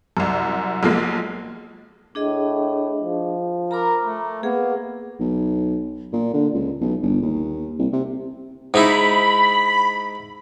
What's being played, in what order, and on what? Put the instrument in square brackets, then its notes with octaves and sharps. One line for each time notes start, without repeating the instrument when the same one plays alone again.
[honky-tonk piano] C2 F#2
B1 F3 G#3 A#3
[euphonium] A2 [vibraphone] D4 G#4 D#5
[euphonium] F3
[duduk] A#4 [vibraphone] A#5 B5 D6
[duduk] A3
[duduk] A#3 [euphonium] B3 [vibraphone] G#4
[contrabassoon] B1
A#2
D3
C#2
B1
G1
D#2
C2
C3
[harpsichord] G#2 D#4 E4 [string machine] B5